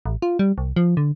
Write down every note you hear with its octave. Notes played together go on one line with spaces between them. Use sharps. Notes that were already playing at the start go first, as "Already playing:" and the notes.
A1
F4
G3
C2
F3
D3